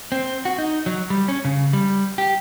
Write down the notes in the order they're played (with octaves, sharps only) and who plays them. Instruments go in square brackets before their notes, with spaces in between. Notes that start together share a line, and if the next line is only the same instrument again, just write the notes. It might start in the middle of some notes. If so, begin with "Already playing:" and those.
[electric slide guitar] C4
F#4
D#4
F#3
G3
C#4
C#3
G3
G4